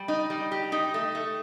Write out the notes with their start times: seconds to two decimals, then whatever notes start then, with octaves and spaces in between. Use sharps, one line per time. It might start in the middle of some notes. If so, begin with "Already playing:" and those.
Already playing: G3
0.08 D#4
0.30 G3
0.51 G4
0.72 D#4
0.94 A3
1.15 A3